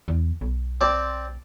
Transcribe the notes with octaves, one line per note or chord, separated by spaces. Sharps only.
E2
B1
C4 D5 A5